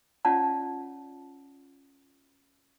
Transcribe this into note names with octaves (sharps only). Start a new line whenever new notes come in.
C#4 F4 C#5 D5 F#5 A5